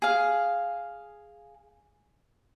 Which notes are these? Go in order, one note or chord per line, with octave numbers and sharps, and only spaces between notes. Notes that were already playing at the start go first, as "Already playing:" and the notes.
G#4 F5